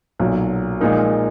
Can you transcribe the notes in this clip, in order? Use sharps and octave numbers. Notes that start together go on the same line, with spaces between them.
B1 A#2 F#3
A#2 F3 G#3 D#4 A#4